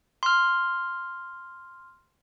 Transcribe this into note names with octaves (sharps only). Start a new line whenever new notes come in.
C6 F6